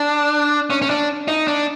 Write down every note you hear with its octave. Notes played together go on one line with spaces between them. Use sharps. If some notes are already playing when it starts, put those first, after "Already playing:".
Already playing: D4
C#4
C#4
D4
D#4
D4